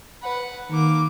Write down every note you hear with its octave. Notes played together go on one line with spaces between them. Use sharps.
B4 F#5
D#3 A#3 D6